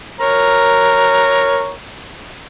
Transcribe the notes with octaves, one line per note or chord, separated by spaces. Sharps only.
A#4 C#5 A#5